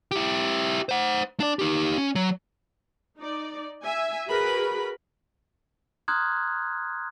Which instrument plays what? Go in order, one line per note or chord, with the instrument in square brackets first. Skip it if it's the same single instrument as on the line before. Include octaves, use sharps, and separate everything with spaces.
[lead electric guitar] E4 G4
C5 F#5
D4 D5
D#4 G4
C#4
F#3
[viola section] D#4 D5
E5 G#5
F#4 G#4 A#4 B4 B5
[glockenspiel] A#5 C6 D#6 F6 F#6 G#6